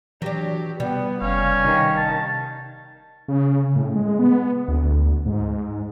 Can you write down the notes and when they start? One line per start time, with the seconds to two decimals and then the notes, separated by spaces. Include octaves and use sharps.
0.22 E3 F#3 D4 G4
0.80 C3 G3 B3
1.22 F#1 C#4 F5
1.65 C3 D#3
1.97 A5
3.28 C#3
3.76 A2
3.95 G#3
4.19 B3
4.68 D2
5.26 G#2